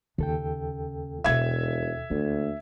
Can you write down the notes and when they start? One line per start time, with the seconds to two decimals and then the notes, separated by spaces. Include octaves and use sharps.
0.18 D#2 C#3 A4 G5
1.24 E1 B2 D#4 E5 G#6
2.10 D2 A#3